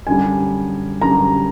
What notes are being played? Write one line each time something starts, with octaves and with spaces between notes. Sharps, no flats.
F#2 D3 G3 G#5
F#2 D3 G3 A#5